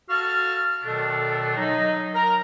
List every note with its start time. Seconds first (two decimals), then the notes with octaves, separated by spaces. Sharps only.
0.10 F#4 A4 F5 A5 F6
0.84 B2 D#3 F#3 A3 D4 A4
1.58 F#3 D#4 D#5
2.14 A#4 A#5